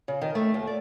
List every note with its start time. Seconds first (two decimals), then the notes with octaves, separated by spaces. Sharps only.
0.08 C#3
0.22 D#3
0.35 A3
0.54 D#2
0.67 D5